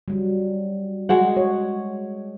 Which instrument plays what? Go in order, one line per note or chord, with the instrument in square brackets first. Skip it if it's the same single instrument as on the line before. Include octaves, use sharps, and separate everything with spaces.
[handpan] F#3 G3
[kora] G#3 F#4 F#5 [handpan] G#4
[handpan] C#5